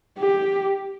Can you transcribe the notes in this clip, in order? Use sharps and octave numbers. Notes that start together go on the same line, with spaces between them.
G4